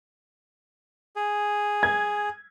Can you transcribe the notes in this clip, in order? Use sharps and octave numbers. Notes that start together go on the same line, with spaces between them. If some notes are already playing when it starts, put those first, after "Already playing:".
G#4
G#6